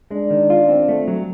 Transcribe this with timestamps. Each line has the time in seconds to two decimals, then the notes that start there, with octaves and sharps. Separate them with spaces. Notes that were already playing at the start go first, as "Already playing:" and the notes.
0.11 G#3 D4
0.30 D#3
0.50 F4
0.69 C4
0.89 A3
1.08 F#3